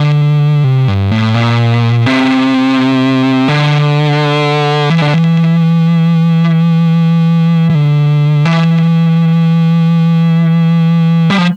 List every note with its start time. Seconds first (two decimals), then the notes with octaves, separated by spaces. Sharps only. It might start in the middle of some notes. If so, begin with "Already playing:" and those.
Already playing: D3
0.64 C3
0.88 G2
1.11 A2
1.34 A#2
2.06 C3
3.48 D3
4.90 E3
5.02 D3
5.14 E3
7.70 E3
7.75 D3
8.45 E3
11.30 G3
11.38 F3